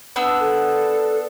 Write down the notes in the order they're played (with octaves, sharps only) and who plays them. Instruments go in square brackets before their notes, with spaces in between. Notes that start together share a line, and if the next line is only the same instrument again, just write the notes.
[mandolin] B3 D4 E6
[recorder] A4